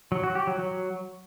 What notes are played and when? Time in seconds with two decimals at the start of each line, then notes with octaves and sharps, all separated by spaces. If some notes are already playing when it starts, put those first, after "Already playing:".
0.12 F#3
0.24 F#4
0.35 G4
0.47 F#3
0.59 F#3